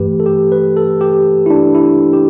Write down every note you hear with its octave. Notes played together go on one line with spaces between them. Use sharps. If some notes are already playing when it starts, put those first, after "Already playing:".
Already playing: G2 E3 A3 G4 B4
A4
G4
B4
A4
G4
E4
D4
E4
G4